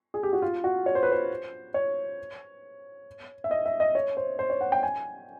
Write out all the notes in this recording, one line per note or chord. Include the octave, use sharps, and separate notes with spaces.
G#4
G4
F#4
F4
F#4
C#5
C5
B4
C5
C#5
E5
D#5
E5
D#5
C#5
C5
C5
C#5
F#5
G5
G#5